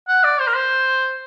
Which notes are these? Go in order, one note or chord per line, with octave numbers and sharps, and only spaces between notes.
F#5
D5
C5
A#4
C5